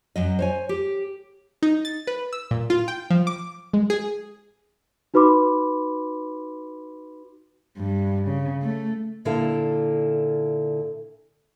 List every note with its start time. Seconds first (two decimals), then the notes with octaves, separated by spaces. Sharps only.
0.16 F#2 F#3 D#5
0.39 C5 C#5 G#5
0.69 G4
1.63 D#4
1.85 A6
2.07 B4
2.33 E6
2.51 A#2
2.70 F4
2.88 G5
3.10 F3
3.27 D6
3.73 G#3
3.90 G#4
5.14 D#4 F#4 B4 B5 C6 D6
7.78 G2
8.28 C#3
8.61 A3
9.25 A#2 D3 E4 A4 F5